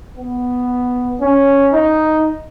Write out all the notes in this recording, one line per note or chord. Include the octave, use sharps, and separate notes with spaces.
B3
C#4
D#4